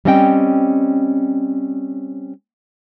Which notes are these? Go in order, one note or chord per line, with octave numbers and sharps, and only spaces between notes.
G3 C4 C#4 D#5 F#5 G5